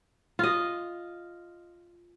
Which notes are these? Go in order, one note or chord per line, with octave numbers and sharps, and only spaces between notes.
F4 D#5